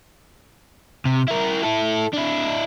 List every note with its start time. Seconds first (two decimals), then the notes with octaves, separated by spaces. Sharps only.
1.06 C3
1.28 E4 A#4
1.64 E4 A4
2.14 D4 E4